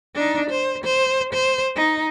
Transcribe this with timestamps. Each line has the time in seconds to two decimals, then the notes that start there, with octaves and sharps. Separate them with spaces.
0.15 D4 D#4
0.50 C5
0.84 C5
1.33 C5
1.76 D#4